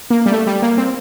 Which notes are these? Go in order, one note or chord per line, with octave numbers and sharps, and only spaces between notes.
A#3
G3
A3
G3
A#3
C4